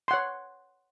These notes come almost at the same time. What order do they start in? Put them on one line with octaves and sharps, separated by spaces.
C6 F#5 C#5